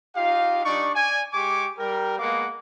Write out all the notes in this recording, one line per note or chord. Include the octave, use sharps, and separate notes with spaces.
D#4 F4 G4 F5
G3 D4 D#4 D5 C#6
D5 G#5
G#3 G4 G#5 C#6 D6
G3 A#4 G5
G#3 A#3 B3 F5 F#5 D6